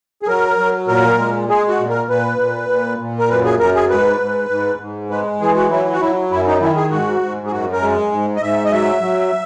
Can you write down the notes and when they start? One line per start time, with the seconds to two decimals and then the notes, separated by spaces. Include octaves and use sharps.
0.22 G#4
0.28 F#3 A#4
0.58 F#3
0.88 A#2 A#4
1.18 G#3
1.48 G#3 G#4
1.69 F#4
1.79 A#2
1.89 A#4
2.09 A#2 B4
2.39 A#2
2.69 A#2
2.99 A#2
3.19 A#4
3.29 F#2 B4
3.44 G#4
3.59 F#2 A#4
3.75 G#4
3.90 G#2 B4
4.20 G#2
4.50 G#2
4.80 G#2
5.10 G#3 B4
5.40 E3 G#4
5.55 F#4
5.71 F#3 E4
5.92 F#4
6.01 F#3 E4
6.31 F#2 E4
6.47 D#4
6.61 D#3 E4
6.76 G#4
6.91 G#2 F#4
7.21 G#2
7.47 G#4
7.51 F#2 F#4
7.72 A#4
7.82 G#3
8.12 G#2
8.36 D#5
8.41 G#2 E5
8.65 D#5
8.72 F#3 E5
9.02 F#3